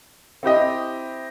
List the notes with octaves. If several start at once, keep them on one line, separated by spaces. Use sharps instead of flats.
C4 E4 G4 D#5